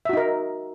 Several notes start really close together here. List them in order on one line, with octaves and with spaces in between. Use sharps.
E5 F#4 D#4 A#4